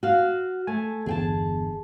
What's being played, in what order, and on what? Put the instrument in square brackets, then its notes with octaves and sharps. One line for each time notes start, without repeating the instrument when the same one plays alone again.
[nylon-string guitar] F#4 F5
[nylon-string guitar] A3 [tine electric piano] G#5
[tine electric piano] G1 E2 [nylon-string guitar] G#4 G5 A5